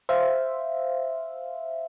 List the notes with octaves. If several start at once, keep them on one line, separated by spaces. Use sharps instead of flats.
C5 E5 F5